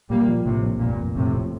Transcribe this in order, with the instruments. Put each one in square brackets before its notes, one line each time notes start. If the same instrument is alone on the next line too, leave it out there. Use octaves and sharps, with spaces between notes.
[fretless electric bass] A#2 [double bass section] G3 A#3
[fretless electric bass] F3
[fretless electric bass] A#1 [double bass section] A2 C3
[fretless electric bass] A#1
[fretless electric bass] F1 [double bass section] G2 A#2
[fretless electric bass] F1
[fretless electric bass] F1 [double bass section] A2 C3
[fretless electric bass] F2